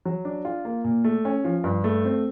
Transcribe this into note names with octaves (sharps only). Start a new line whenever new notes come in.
F#3
D4
F4
A#3
A#2
A3
C#4
F3
G2
A3
C4